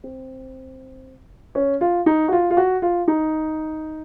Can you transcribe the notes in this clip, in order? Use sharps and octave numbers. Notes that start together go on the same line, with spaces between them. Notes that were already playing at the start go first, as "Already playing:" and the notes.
C4
C#4
F4
D#4
F#4
F4
F4
F#4
F4
D#4